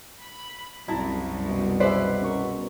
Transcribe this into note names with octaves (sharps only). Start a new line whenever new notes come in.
B5
C2 F#2 E4 F#4 A5 A#5
B2
E4 G#4 B4 C5 D5 E5
C#4 A#4 C#6